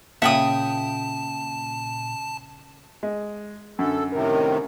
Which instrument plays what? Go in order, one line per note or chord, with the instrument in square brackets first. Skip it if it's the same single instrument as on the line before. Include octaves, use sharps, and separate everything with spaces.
[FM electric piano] A#2 [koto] C#3 F#5 [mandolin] E5 G5 D#6 [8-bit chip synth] A5
[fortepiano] G#3
[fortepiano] F#2 D3 [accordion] A4
[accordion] A2 C3 D#3 [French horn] A#4